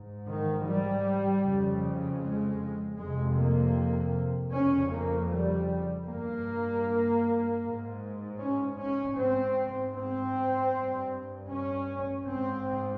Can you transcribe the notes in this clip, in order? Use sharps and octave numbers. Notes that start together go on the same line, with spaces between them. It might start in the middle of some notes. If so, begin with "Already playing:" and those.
Already playing: G#2
D#3
G3
F2 C#3
G#3
F2 C3 G#3
A#3
F2 C#3 C#4
A#3
G3
G2 A#3
G#2
C#4
C#4
G#2 C4
C4
G2
C#4
G#2 C4